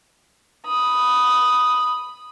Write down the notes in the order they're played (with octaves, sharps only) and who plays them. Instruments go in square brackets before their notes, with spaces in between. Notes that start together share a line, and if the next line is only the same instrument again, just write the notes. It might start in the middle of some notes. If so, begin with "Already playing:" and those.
[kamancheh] B5 D#6